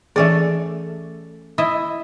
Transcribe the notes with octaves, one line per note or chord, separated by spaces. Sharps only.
E3 A3 C#4 G#4 D5
E4 D#5 E5